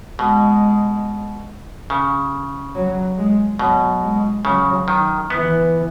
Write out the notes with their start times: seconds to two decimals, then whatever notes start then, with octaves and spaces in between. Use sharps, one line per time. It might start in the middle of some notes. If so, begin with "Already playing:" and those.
0.19 B2 G#3
1.90 C#3
2.75 F#3
3.17 G#3
3.59 B2 F#3
4.02 G#3
4.45 C#3 F#3
4.88 D#3
5.30 E3 B3